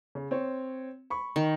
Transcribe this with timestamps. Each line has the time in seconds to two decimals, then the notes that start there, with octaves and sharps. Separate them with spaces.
0.15 C#3
0.31 C4 C#5
1.10 B5 C#6
1.36 D#3